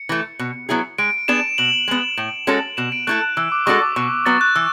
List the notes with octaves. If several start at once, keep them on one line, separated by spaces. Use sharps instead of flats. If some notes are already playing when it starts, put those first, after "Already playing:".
Already playing: C#7
E3 A3
B2
F#3 B3 E4 G#4
G#3 D7
B3 D4 G#4 E7
B2 F#7
G#3 B3
A2
G#3 C#4 F#4 A4
B2 E7
D7
A3 E4 A4 F#6
F#6
E3 E6
D6
G#3 D4 F#4 A4 C#6
D6
B2 C#6
F#3 B3 A6
F#6
E3 E6